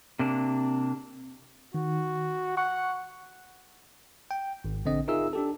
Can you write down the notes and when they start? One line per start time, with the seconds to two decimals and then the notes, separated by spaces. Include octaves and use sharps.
0.19 C3 A#3 D4
1.74 D#3 F#4
2.57 F#5 C#6
4.31 G5
4.64 G#1
4.85 A#1 D3 C4 D#5
5.08 D#4 F4 G#4 A#4 E5 E6
5.33 D4 G4 A4